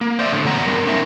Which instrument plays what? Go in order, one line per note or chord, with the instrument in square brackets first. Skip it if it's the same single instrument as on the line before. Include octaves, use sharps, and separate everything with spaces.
[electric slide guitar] A#3
C5 D5 E5
A2 D3
E2 A#2 B3 C#5 F#5 A#5
G2 G3 B3 A#4
C#4 D#4 A#4 E5